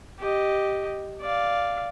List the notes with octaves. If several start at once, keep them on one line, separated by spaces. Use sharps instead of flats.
G4 D#5
D5 F5